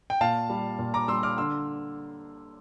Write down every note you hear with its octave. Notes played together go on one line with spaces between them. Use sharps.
G5
A#2 F5 A5
G3
A#2
A#5 D6
G3 C6 E6
D6 F6
D3 C6 E6